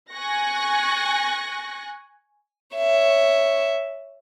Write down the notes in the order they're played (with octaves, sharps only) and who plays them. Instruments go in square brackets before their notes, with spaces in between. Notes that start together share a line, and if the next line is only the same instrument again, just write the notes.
[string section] G#5 C#6 F#6 A#6
[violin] C#5 E5